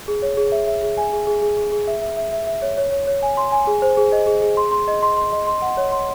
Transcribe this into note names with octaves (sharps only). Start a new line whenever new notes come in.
G#4
C#5
G#4
E5
E5
G#4
G#5
G#4
G#4
G#4
G#4
G#4
E5
E5
E5
E5
E5
C#5
C#5
C#5
C#5
G#5
C6
G#5
G#4
C5
G#4
D#5
G#4
G#4
C6
C6
D#5
C6
C6
D#5
C6
F#5
C#5
C6